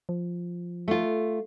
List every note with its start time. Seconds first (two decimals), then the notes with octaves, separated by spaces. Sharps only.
0.09 F3
0.88 A3 F4